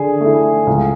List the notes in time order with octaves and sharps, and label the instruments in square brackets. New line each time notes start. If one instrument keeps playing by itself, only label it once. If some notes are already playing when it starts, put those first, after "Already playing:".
Already playing: [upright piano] D3 [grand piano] G#4
[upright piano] A3 E4
C#2